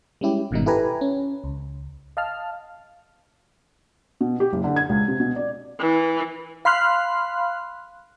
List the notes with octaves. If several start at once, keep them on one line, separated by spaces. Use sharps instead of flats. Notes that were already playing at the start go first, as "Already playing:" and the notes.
G3 G#3 C#4 E4 G4
G1 G#2 B2 D#3 G3 D#4
E4 G4 A4 B4 G#5 A#5
C#4
C#2
D#5 F5 A5 F6
B2
G4
F#1
D3
G#6
C#2
C3
B2
D5
E3
F5 B5 C6 F6 F#6